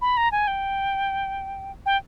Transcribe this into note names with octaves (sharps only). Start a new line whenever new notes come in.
B5
A#5
G#5
G5
G5